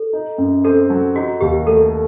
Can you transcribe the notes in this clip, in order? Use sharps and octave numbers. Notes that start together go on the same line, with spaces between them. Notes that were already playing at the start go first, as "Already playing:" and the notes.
Already playing: A4
D#4
F#2
C4 A4
F#3
D#4 F#4
D#2 G4
A3 A4